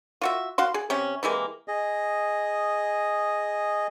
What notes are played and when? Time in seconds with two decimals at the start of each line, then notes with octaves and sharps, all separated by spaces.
0.21 F4 F#4 E5
0.58 F#4 F5 C6
0.74 G#4
0.90 C3 C#4
1.23 C3 E3 G#3 A#3
1.68 G#4 D#5